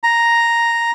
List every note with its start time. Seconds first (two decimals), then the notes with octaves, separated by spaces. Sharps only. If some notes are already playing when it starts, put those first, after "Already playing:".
0.04 A#5